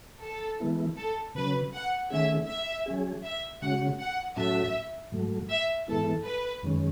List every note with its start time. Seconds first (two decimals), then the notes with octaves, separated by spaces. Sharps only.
0.22 A4
0.60 E3 G#3 B3 E4
0.97 A4
1.35 C#3 F#3 C#4 B4
1.74 F#5
2.10 D#3 A3 C#4 G#4 E5
2.48 E5
2.86 F#3 C#4 G#4
3.24 E5
3.62 C#3 G#3 C#4 F#4 F#5
4.00 F#5
4.36 A2 F#3 C#4 F#4 A4 E5
5.12 G#2 F#3 A3
5.50 E5
5.88 G#2 E3 G#3 B3 E4 A4
6.25 B4
6.63 F#2 D#3 G#3 C#4